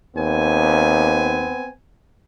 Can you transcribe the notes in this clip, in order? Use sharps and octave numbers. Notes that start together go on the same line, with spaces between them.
D#2 B3 C4 G#5